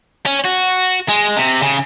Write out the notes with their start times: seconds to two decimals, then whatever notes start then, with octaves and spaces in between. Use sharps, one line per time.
0.26 C#4
0.45 F#4
1.09 G#3
1.37 C3
1.63 C#3